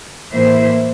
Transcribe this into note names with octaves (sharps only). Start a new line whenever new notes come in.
A2 E3 A#3 E4 C5 E5